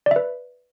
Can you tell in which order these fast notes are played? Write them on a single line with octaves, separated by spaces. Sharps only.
D5 E5 B4